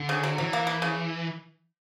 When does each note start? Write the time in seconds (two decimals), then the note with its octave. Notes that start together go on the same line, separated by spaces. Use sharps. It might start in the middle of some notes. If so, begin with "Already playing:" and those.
Already playing: D3
0.09 C#3
0.23 F#3
0.38 E3 F#3
0.53 A#3
0.67 A#3
0.82 C#3